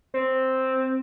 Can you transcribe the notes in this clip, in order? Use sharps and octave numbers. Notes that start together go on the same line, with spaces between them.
C4